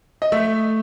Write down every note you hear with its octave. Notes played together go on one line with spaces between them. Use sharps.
D#5
A3 E5